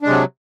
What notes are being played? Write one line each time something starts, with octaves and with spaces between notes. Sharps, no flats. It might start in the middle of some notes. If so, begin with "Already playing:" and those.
C3 F#3 G#3 D4